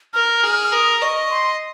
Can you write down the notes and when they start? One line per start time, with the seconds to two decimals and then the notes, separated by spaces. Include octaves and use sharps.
0.14 A#4 F6
0.44 G#4
0.64 F6
0.72 A#4 D#6
1.01 D#5 C#6
1.31 C6